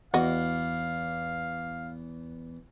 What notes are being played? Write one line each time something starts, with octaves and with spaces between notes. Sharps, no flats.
E2 F#4 D#5 F5